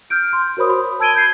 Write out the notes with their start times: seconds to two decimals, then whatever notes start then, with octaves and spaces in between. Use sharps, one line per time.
0.10 F6 G6 D7
0.33 C6
0.57 F#4 A#4 C5 C#5 B5 D#6
0.70 B5
1.00 A5 E6 G#6 D7 D#7 G7
1.14 B5 G6 G#6 C7